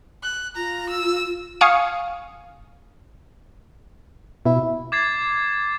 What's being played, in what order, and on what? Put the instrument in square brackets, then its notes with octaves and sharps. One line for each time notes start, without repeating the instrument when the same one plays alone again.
[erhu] F#6
[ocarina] F4 [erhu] A#5
[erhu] E6
[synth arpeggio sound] F5 G#5 C#6 D#6 F6 C#7
[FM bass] B2 [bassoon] E4
[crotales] D6 G#6 A6 C7